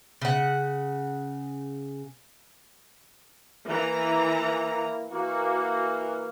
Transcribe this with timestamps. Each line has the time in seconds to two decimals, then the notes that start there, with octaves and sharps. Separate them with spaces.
0.22 C#3 F#5
3.69 E3 A#3 E4 A#5
5.12 E3 A#3 F#4